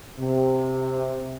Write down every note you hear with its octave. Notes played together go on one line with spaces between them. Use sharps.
C3